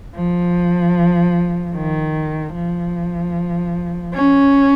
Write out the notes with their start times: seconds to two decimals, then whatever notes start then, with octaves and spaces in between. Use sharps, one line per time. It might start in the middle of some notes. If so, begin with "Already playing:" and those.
0.15 F3
1.75 D#3
2.54 F3
4.15 C#4